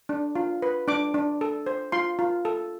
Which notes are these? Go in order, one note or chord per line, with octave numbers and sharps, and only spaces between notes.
D4
F4
B4
D4 D6
D4
A4
C5
F4 C6
F4
A4